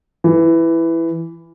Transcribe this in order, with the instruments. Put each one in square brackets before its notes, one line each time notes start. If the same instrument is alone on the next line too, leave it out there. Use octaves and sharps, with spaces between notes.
[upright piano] E3